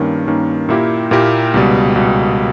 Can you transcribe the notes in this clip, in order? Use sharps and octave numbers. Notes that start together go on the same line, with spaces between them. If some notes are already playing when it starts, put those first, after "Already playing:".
Already playing: G2 D#3 A#3 C#4
G2 D#3 A#3 C#4
A#2 A#3 E4 G4 A#4
A#2 A#3 E4 G4 A#4
C#2 B2 G3
C#2 B2 G3